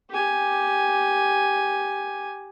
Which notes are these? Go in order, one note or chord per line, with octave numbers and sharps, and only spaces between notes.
G4 G#5